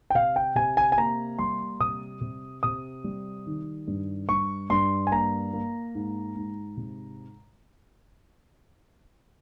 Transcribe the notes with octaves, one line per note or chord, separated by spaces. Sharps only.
G5
C3 F5
G5
C3 G#5
G#5
G#5
A#3 A#5
G3 C6
C3 D#6
C3
C3 D#6
G3
D#3
G2
G2 C#6
G2 C6
G#5
A#3 A#5
A#3
G#2
G#2
C3